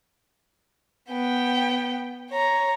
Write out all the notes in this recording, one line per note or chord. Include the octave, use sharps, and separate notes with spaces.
B3 G5
C#5 A#5